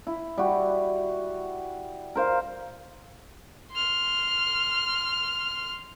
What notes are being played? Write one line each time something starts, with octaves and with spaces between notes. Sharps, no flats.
E4
G3 F#4
A#4 C5 F5
C6 F6